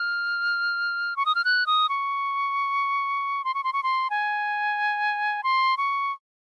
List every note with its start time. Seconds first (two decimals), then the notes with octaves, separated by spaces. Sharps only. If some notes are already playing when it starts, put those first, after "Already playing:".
Already playing: F6
1.16 C#6
1.26 D#6
1.35 F6
1.45 F#6
1.66 D#6
1.89 C#6
3.44 C6
3.54 C#6
3.64 C6
3.73 C#6
3.83 C6
4.10 G#5
5.43 C6
5.77 C#6